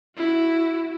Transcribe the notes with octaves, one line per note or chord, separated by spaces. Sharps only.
E4 F#4